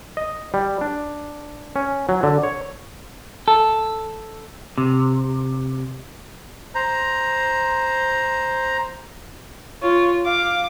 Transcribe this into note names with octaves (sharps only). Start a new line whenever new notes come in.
D#5
G3
D4
C#4
F#3
D3
C#5
A4
C3
C5 A#5
F4 C#5
F5 D6